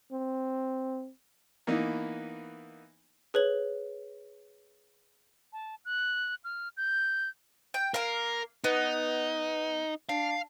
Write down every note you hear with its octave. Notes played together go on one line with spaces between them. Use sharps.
C4
E3 A#3 B3 D#4
G#4 B4 C#5 F#7
A5
F#6
F6
G6
G5
A#3 A#4 F5
B3 D#4
D4 F5